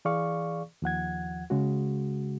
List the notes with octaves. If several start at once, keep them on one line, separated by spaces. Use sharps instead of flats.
E3 G#4 D5 F5 C#6
D#2 F3 F#5 G#6
C#3 G#3 F#4